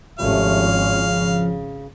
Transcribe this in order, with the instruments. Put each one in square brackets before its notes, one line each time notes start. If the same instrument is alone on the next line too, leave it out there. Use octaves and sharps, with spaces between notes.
[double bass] G#1 C#4 [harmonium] C3 A3 [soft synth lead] F3 [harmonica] F5
[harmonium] C#3